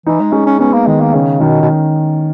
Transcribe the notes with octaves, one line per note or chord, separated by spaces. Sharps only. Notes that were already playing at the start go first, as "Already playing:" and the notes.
E3 D#4
G#3
G#3 C#4
C#4
B3 C#4
A#3
D#3 G#3
A#3
C#3 C#4
B2 D#3
B2